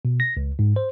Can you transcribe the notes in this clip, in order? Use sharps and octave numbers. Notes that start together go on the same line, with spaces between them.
B2
A#6
C#2
G#2
C5